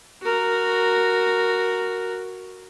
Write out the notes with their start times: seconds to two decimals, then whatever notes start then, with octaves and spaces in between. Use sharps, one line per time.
0.22 F#4 A#4